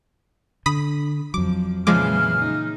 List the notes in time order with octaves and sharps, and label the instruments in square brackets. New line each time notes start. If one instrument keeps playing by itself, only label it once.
[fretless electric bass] D3 [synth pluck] B5 D#6 B6
[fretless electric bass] F2 F#3 [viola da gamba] F3 [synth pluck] D6
[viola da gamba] A#2 C#3 E3 [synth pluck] F3 G#3 D6 [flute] F6
[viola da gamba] D#4